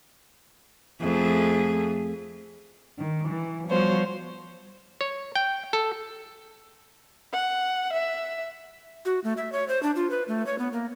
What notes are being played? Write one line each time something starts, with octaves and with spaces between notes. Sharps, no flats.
F2 A3 G#4
D#3
E3
F3 G3 B3 F#4 C5 C#5
C#5
G5
A4
F#5
E5
F#4
A3
E5
C#5
C5
D4
F4
B4
A3
C#5
B3
A#3